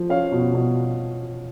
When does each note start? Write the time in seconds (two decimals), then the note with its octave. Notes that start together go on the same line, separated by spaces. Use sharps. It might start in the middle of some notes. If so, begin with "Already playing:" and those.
Already playing: F3
0.09 C#4 F5
0.32 B2
0.54 B2